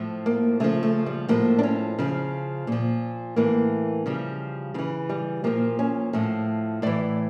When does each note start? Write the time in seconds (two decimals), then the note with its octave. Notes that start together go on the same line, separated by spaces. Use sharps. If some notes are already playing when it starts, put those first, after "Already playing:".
Already playing: A2 F3
0.26 A#3
0.60 C#3 F3 A3
0.83 A3
1.06 G3
1.28 A2 F3 A#3
1.59 D4
1.63 C#4
1.99 C#3 F3
2.67 A#2 F3
3.36 A2 E3 A#3
4.06 C#3 F3 G3
4.74 C#3 F3
4.78 E3
5.09 G3
5.44 A#2 F3 A#3
5.79 C#4
6.13 A2 F3
6.82 A2 E3 D5